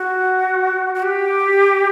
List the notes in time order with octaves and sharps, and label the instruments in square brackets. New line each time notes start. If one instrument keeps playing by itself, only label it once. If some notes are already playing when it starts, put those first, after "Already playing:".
Already playing: [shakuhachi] F#4
F#4
G4